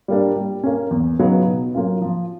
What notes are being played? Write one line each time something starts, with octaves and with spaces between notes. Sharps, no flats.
G3 A#3 D4
G3
A#3 C#4
E2
C#3 F#3 B3 D#4
B2
F#3 A#3 C#4 F4
F3